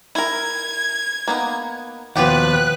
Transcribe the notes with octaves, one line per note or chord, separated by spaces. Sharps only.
E4 A#4 G#6
A#3 B3 D#4
D#2 B2 F3 G4 B4 F#5 F#6